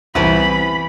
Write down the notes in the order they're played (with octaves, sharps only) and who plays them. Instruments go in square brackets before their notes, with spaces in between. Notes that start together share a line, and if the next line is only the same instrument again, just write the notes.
[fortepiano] C2 [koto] E3 B3 [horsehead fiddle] B5